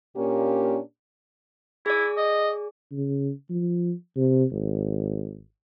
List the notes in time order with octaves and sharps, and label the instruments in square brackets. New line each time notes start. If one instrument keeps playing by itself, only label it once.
[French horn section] A#2 A#3 C#4 D4 G4 A#4
[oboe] E4 [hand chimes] G#4 D5
[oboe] D#5
[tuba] C#3
F3
C3
G#1